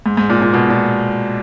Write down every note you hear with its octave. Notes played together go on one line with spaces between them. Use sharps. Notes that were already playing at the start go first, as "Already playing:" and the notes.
G#2
G#2
A#2
A#2
B2
A#2